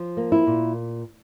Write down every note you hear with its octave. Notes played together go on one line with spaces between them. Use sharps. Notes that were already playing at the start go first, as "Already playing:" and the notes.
Already playing: F3
A#3
E4
A#2